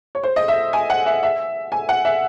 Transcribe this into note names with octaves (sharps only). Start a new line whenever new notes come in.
C#5
C5
D#5
E5
G#5
F#5
E5
E5
G#5
F#5
E5